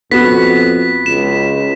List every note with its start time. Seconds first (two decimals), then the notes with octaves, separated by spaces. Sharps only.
0.11 F2 B3 F#4 B6
1.06 C#2 E7